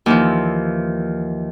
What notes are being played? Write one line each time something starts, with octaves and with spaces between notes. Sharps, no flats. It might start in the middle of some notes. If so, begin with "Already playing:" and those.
D#2 E3 F3